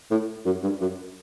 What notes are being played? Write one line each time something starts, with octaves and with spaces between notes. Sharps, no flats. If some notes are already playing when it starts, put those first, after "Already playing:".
A2
F#2
G2
F#2